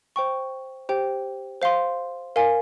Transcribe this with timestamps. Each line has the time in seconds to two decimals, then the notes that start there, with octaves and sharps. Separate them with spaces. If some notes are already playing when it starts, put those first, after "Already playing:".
0.16 C5 G5 C#6
0.89 G4 C5 G5
1.62 C5 F5 C6
2.36 A#4 F5 G#5